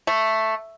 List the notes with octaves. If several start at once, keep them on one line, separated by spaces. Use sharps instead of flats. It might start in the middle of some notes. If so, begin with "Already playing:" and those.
A3